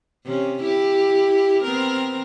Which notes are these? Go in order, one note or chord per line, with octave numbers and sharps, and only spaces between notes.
C3 C#4
E4 G4
B3 C4 A#4